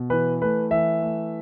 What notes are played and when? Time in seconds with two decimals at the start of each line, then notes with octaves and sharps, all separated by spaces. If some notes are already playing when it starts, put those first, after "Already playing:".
Already playing: B2
0.10 E3 B4
0.42 A3 B4
0.71 E3 E5
1.02 A3